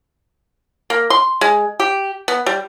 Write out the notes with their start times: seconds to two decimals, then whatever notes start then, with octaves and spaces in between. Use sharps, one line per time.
0.90 A#3
1.10 C6
1.41 G#3
1.80 G4
2.28 B3
2.46 G3